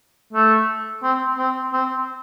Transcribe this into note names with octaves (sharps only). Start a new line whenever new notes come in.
A3
C4
C4
C4